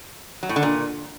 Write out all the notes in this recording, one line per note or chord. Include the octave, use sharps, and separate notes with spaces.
F#3
A2
D3
A#2